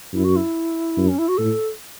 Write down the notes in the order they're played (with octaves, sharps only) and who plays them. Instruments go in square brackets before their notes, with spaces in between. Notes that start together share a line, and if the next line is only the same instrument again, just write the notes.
[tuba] F#2 [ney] E4
[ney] F#4
E4
[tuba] F#2
[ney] C#4
E4
F#4
[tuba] A2 [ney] A4